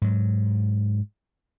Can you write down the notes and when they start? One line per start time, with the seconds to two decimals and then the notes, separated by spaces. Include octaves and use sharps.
0.02 G#2 F#3